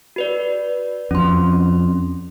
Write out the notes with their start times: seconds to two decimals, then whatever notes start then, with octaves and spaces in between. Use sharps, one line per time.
0.16 F#4 B4 D5
1.11 F2 C#4 C6